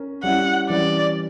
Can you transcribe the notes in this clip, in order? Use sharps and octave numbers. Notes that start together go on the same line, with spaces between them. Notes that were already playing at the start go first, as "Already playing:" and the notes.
Already playing: C#4 A#4
G3 C#4 E4 F#5
E3 G3 C#4 E4 D5